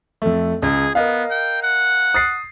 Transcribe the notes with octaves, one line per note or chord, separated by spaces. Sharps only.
F2 A3
C#2 G#4
B3 A#4 D#5 F5
G5
F#5
D#6 A6 C7